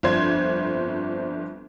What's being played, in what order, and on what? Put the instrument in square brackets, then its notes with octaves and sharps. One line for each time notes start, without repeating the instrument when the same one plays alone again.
[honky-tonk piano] G1 F2 D4 C5 C6 G#6